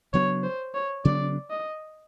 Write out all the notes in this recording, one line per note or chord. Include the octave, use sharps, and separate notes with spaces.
C#3 F#3 B3 D4 C#5
C5
C#5
C#3 F#3 B3 D4 D5
D#5